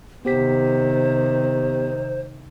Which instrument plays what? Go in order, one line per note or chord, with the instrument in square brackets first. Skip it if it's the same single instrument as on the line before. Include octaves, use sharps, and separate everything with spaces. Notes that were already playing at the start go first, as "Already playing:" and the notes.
[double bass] C3 D#3 [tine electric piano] B3 G4 B6 [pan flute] C5